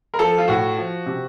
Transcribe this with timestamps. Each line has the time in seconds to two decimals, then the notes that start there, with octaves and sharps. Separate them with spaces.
0.14 A#4
0.19 F3 A4
0.38 F4
0.48 A2 F#4
0.77 F3
1.06 C3